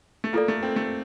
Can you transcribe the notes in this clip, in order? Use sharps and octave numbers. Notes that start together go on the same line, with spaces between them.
A3
A#3 F4 A4 D5
A3
C4
A3